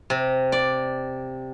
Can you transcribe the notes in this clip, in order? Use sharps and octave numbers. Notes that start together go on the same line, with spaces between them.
C3
D5